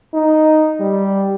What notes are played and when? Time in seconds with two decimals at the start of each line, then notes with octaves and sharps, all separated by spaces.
0.14 D#4
0.80 G3